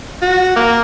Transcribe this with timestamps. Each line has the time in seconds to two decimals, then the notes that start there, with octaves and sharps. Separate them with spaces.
0.22 F#4
0.56 A#3